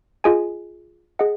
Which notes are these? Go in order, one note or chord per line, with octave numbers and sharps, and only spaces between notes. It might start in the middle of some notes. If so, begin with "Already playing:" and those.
F4 G#4 D#5 G#5
G#4 D#5 F#5